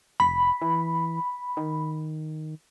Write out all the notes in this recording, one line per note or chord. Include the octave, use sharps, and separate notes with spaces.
F1 B5
E3
D#3